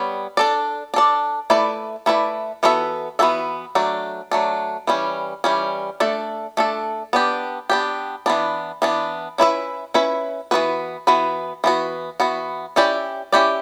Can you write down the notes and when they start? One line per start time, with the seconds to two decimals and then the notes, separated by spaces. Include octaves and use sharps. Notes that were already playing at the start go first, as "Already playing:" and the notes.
Already playing: G3 B3 C#5
0.37 D4 A4 D5
0.94 D4 A4 D5
1.50 A3 E4 B4 D5
2.06 A3 E4 B4 D5
2.63 E3 B3 F#4 A4 E5
3.19 E3 B3 F#4 A4 E5
3.75 F#3 A3 D4
4.31 F#3 A3 D4
4.87 E3 G3 C#4
5.44 E3 G3 C#4
6.00 A3 D4 A4
6.57 A3 D4 A4
7.13 B3 D4 G4
7.70 B3 D4 G4
8.26 E3 B3 D4
8.82 E3 B3 D4
9.38 C#4 E4 B4 E5
9.94 C#4 E4 B4 E5
10.51 E3 B3 F#4 B4
11.07 E3 B3 F#4 B4
11.64 E3 B3 F#4
12.20 E3 B3 F#4
12.76 C#4 E4 G4 D5
13.33 C#4 E4 G4 D5